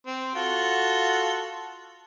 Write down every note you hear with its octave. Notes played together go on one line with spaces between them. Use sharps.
C4
F4 F#4 A4